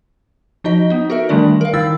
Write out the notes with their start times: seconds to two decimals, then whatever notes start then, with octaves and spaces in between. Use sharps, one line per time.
0.64 F3 D#4 F#4 D#5
0.90 B3 D#4
1.10 F#4 A4 A#4 E5
1.29 D#3 E3 G3 A3 D4 D5
1.61 A#4 F5
1.74 D#3 D#4 E4 E6 A6